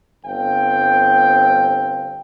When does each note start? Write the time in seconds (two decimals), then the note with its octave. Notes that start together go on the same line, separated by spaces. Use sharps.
0.26 G1 C4 F5 G5